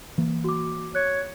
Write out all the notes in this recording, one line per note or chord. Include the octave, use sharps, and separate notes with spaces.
E3 A#3
F#4 D6
C#5 F#6